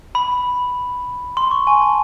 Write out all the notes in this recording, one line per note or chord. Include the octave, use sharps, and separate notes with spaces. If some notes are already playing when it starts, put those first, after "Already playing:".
B5
C6
C#6
G#5
A5